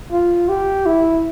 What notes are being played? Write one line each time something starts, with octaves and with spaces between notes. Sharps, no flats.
F4
G4
E4